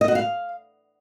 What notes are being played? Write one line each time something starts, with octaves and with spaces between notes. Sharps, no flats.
D#5
F#4
F5